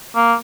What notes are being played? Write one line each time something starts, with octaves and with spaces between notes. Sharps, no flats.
A#3